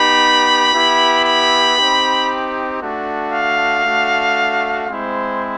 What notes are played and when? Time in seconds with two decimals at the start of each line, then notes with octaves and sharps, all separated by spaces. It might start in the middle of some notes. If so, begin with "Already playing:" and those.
Already playing: B3 D#4 G4 B5
0.73 B3 E4 G4
1.25 B5
1.77 C4 D#4 G4
2.81 A3 D4 F#4
3.32 F5
3.84 A3 D4 F#4
4.88 G#3 C4 E4 C5